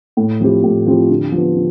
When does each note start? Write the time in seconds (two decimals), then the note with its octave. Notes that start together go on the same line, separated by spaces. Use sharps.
0.17 A2
0.40 F3 C4 E4 G4
0.64 A2
0.86 F3 C4 E4 G4
1.10 D3
1.32 F3
1.37 B3
1.56 D3